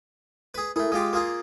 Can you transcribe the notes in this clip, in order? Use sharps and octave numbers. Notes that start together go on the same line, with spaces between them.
G#4 B4
A3 E4 G#4 A#4
G#3 F4 G4 D#6
A#3 F4 G#4